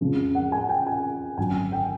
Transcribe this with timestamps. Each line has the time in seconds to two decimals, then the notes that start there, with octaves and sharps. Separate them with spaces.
0.01 F2 C#3 F3 G#3
0.35 F#5
0.52 G#5
0.69 G5
0.87 G#5
1.38 G#1 F#2 D3 F#3 G#5
1.72 G5